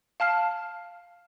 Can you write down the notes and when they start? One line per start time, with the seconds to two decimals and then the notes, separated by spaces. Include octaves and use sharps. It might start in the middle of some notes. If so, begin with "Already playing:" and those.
0.20 F5 A5 F6 C7